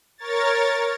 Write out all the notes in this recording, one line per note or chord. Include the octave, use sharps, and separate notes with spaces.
A#4 C#5 A6